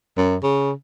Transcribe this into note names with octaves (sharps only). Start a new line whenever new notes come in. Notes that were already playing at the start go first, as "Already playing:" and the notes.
F#2
C#3